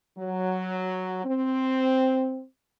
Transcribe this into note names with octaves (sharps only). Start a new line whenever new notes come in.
F#3
C4